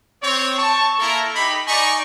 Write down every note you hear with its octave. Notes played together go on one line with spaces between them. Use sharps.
C4 C#5
A5 C#6
A#3 E4 A4 A#4
D#4 G4 B5
D#4 D5 G#5 C#6